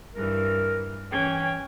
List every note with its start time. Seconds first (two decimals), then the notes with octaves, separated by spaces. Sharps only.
0.15 G2 E3 A#4
1.10 E3 C#4 G5 G#6